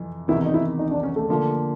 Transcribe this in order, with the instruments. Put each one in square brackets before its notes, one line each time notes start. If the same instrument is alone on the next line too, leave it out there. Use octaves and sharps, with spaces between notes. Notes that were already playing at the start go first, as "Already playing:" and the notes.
Already playing: [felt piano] F2 C3 E3
[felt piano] E2 C3 D#3 [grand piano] E4
[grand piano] D#4
E4
D#4
D4
C#4
A3
[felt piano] D3 F3 A#3